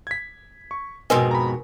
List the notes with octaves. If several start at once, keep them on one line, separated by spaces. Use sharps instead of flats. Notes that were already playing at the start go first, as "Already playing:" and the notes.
G#6 B6
C#6
F2 G#2 B2 A#4 B4 D#5 G#5 C6
A#5 B5